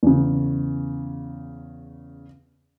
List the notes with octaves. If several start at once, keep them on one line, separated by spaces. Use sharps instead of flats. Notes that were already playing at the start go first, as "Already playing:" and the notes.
E2 C#3